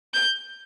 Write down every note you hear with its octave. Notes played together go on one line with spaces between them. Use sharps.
G6